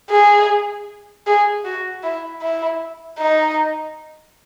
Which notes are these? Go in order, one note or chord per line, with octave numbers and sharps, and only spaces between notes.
G#4
G#4
F#4
E4
E4
D#4